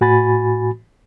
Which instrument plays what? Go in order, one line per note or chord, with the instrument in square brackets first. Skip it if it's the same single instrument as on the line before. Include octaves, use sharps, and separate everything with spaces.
[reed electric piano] A2 F#4 G#5 B5 A6